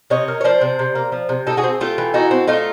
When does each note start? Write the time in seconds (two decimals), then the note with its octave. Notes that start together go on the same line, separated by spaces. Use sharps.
0.10 C3 C#5 D#5
0.28 A#3
0.41 C#5
0.44 F3 C5 D5
0.61 C3
0.79 C3
0.95 A#3
1.12 F3
1.29 C3
1.47 D#4 G4 A4
1.57 F#4 G#4
1.64 C4
1.81 A3 F4 G4
1.98 E3
2.14 D#4 E4 F#4
2.31 C4
2.48 A3 D#4 F4